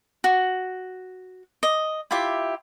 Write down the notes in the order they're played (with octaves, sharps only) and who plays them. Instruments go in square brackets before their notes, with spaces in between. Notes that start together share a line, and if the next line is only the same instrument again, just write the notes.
[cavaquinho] F#4
D#5
E4 F4 G4 E5